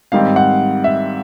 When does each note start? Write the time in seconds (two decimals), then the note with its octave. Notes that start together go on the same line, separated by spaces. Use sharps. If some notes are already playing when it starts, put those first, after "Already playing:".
0.12 G#2 D#3 G3 C4 F5
0.36 F#5
0.84 E5